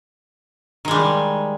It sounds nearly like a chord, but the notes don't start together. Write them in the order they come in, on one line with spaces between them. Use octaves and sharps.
D#3 G#3 G3